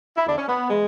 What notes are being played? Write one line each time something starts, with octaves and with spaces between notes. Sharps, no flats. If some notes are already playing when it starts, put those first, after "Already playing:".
E4
E2 D3 D4
C#4
B3
E3 G#3